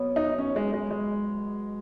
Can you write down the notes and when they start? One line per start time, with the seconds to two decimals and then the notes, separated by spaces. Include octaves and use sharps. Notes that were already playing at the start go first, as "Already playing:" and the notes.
Already playing: B2 F#3 B3
0.16 D#4
0.38 C#4
0.56 G#3
0.73 G#3
0.91 G#3